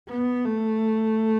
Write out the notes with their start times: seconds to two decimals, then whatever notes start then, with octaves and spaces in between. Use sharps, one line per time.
0.09 B3
0.45 A3